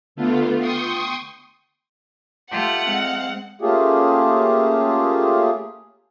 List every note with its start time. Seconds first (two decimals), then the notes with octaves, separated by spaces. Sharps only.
0.16 D3 A3 B3 F4
0.59 G5 C6 C#6 D#6
2.51 A3 F4 G4 F#5
2.86 G#3 C4 F5
3.61 A3 A#3 C#4 F4 G4 G#4